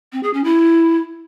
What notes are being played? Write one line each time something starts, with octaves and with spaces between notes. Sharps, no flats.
C4
G#4
C#4
E4